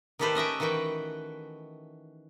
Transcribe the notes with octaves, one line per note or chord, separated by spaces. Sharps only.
D#3 A3 G4 A4 B4 C5
C#4 D#5 E5 G5
D#3 E3 F#4 B4 G5